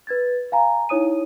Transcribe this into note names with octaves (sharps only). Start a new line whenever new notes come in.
B4 G#6 A6
F5 G#5 A#5
D#4 E4 C#5 D#6 D#7